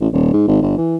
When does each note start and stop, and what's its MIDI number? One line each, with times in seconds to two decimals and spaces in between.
0.01 0.08 33
0.13 0.32 27
0.33 0.43 44
0.47 0.61 32
0.62 0.76 31
0.78 0.97 52